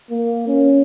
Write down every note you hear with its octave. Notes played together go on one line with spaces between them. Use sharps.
A#3
C#4